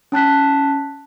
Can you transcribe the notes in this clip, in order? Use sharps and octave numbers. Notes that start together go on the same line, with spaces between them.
C#4 A5 F#6 B6